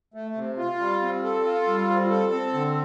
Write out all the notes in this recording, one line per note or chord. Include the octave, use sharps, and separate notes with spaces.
A3
C3
F4
G3
C4
A4
F4
G3
C4
A4
C4
D3